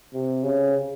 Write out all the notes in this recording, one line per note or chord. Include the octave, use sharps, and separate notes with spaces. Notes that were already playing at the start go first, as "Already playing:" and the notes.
C3
C#3